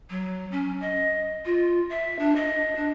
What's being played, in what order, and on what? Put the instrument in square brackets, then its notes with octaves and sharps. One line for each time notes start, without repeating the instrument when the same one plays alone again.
[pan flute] F#3
C#4
D#5
F4
E5
D4
D#5
D4